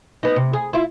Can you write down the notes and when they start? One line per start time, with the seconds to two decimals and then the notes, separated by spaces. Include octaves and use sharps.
0.23 B3 D#4
0.36 C3
0.53 G#4
0.73 E4 F4